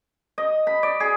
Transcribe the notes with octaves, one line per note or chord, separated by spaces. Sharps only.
D#5
B5
D5
G#4